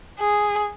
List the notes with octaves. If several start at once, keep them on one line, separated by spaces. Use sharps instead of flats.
G#4